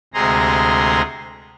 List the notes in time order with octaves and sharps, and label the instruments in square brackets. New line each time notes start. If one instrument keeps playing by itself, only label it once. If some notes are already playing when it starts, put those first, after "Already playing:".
[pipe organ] D2 C3 G#3 G#4 A#5 C6